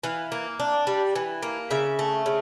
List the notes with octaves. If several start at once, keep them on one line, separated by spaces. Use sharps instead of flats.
E3 F5
A#3
D4
G3
E3
A#3
C#3 E5
A3
C#3